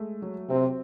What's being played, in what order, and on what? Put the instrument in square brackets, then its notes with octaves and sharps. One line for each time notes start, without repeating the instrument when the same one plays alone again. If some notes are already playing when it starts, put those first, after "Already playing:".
Already playing: [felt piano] G#3 A3
F#3
[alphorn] C3 [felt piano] C4